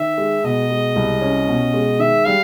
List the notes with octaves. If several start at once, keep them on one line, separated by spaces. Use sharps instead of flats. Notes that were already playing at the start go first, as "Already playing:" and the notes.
Already playing: D#3 E5
G#3
B2 D#5
G#3
C2
C#4
B2
G#3
D#3 E5
G3 F5